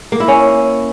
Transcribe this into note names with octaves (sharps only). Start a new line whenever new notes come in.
A#3
E4
C#4